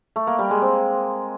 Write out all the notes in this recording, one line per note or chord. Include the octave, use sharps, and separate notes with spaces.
A3
A#3
G3
G#3
C4